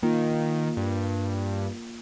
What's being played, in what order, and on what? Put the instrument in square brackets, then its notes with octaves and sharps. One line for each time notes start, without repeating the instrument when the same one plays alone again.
[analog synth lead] D#3 [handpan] A#3 F4
[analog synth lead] G2